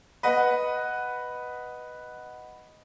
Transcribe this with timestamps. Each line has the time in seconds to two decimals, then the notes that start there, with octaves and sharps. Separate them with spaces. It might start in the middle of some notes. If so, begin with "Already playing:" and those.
0.23 B4 D#5 F#5